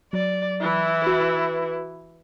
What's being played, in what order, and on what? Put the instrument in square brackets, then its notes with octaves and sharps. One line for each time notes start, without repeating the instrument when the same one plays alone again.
[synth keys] F#3 [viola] D5
[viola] E3 E4
[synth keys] F#4 B4